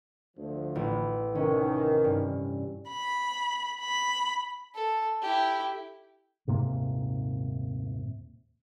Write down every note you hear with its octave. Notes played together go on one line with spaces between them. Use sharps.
D2 F3
A1
C3 D#3 C#4
G2
B5
B5
A4
E4 G4
D#1 G#2 C3 A#3